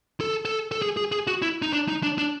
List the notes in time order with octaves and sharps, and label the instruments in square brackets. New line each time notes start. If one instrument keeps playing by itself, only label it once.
[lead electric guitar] A4
A4
A4
G#4
G#4
G#4
F#4
E4
D#4
D4
D#4
D4
D4